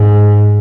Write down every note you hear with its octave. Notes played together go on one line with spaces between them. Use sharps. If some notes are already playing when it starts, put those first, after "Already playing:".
Already playing: G#2